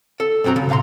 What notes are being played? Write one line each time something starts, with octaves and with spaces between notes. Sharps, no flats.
A4
B1 F#2 C4 F#4 A#5
C#3
C2 A#2 F5 A#5 C6